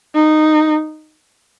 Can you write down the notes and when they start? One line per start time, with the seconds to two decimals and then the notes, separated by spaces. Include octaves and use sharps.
0.15 D#4